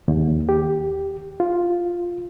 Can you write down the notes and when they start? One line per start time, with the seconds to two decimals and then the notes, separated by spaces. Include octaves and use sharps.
0.08 D#2
0.49 G4
1.40 F4